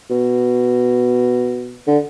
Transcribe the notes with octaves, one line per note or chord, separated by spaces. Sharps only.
B2
D3